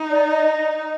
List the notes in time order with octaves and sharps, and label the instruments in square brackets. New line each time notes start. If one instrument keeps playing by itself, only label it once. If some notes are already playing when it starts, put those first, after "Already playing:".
Already playing: [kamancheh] D#4
[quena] D5
D#5
D#5